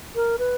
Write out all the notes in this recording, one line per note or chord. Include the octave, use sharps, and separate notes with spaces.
A#4
B4